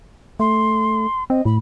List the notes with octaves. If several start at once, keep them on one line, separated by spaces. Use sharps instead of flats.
A3 C6
C4 D#5
A2 B5